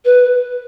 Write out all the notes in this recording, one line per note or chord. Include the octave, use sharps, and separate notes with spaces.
B4